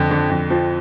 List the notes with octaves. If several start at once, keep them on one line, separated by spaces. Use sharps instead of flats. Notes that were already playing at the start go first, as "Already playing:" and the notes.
Already playing: F2 D3
D3
F2
F3